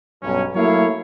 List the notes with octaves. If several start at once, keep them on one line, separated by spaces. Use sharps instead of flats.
B1 G2 C#4
F#3 A3 A#3 E4 C#5 F5